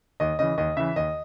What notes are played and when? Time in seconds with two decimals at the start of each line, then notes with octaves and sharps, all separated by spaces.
0.20 D#2 D#5
0.39 C#3 E3 D#5
0.58 D#2 D#5
0.77 C#3 E3 E5
0.96 D#2 D#5